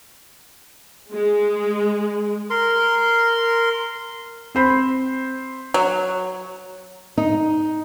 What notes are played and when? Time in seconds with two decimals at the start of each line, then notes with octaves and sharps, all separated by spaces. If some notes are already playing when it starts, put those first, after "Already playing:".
1.12 G#3
2.50 A#4 C6
4.55 C4 C5 B5
5.74 F#3
7.18 D#4